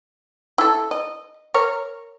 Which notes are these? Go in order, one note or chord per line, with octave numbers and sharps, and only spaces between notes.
E4 A4
D#5
A#4 C#5